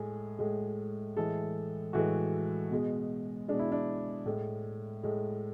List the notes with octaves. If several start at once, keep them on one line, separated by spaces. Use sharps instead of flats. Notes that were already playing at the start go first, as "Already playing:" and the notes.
Already playing: A2 G#3 G#4
A2 G#3
A2 E3 G#3 A4
A2 E3 G#3 F#4
B2 G#3
B2 G#3 D4
E4
D4
A2 G#3
A2 G#3